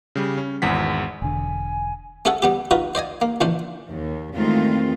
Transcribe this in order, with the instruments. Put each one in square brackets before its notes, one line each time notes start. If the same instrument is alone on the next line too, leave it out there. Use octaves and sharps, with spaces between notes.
[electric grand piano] C#3 G3
C#4
G#1 E2 F#5 B6
[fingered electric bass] E1 D3 [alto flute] G#5
[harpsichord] A3 C#4 G#4 A4 F#5
G3 B3 G4
D#4 F4 F#4 B4
C5 D5 D#5 G#5
A#3
A#1 E3 C#4 D4 C5
[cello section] D#2
E2 D#3 G#3 A3 C4 F4